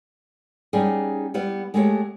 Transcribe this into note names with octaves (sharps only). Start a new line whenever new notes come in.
G3 B3 C#4 D#4 G#4
G3 B3 E4 B4
G#3 A3 B3 G4 B4 C#5